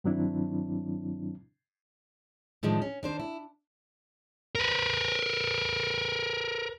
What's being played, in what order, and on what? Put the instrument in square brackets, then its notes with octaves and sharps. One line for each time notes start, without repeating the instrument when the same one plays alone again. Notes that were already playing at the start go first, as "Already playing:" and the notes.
[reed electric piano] G2 D#3 F#3 C4 D4 E4
[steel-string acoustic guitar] A2 D#3 F3 G#3 D4
C#4
D#3 D4 C5
E4
[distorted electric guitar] A#4 B4